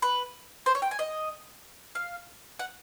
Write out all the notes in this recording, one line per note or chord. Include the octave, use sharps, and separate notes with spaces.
B4
C5
C#5
G5
G#5
D#5
F5
F#5